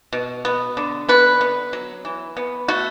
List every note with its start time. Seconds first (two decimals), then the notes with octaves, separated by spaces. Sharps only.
0.13 B2
0.45 B3
0.77 D3
1.09 B3 B4
1.41 B3
1.73 F#3
2.05 E3
2.37 B3
2.68 A3 F#4